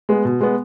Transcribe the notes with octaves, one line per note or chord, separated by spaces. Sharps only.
G#3 B3
B2
G#3 B3